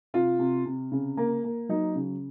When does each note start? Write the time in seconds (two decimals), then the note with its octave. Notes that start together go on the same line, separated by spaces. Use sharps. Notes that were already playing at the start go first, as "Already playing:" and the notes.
0.14 C3 F4
0.39 C3
0.65 C3
0.92 C#3
1.17 A#3
1.44 A#3
1.69 F#3 D#4
1.95 C#3